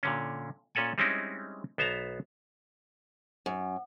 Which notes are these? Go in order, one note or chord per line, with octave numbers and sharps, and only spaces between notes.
A#2 D3 C#4
A#2 C#4 A4 F#5 G#5
G3 G#3 C4 C#4 D#4 E4
B1 B3 C5 E5 A5 A#5
F#2